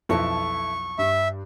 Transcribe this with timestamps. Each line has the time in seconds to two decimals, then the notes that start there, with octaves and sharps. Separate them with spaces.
0.09 B1 F2 E4 A4 E5 C#6
0.99 G2 E5